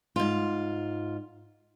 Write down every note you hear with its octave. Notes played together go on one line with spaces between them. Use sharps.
G#2 F4